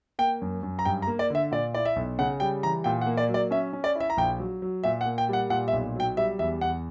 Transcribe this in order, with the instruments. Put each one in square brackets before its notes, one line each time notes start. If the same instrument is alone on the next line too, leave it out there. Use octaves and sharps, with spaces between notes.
[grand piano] A#3 G5
F#2
F#2
A#5
G2 G5
A#5
A#3
D5
D3 E5
A#2 D5
E4 D5
E5
B1
C#3 F#5
G3 G5
E3 A#5
A#2 G5
F#5
A#3
D5
F#3
D5
C#4 E5
C#4
D5
E4
E5
A#5
A#1 G5
F#3
F#3
A#2 E5
F#5
A#3
G5
G3 F#5
A#2 F#5
E5
B1
F#3 G5
G3 E5
E2 E5
E2 F#5